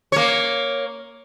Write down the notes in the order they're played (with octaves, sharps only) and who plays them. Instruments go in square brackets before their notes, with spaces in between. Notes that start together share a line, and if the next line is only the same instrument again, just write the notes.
[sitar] A#3 C#5